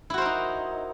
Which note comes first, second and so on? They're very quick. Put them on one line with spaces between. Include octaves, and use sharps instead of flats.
E4 F#4 C5 A#4 D#4